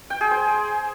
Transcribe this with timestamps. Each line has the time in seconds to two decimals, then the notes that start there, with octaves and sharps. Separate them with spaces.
0.10 G5
0.21 G#4
0.31 C5